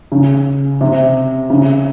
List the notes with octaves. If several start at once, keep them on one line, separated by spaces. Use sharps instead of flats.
C#3
C3
C#3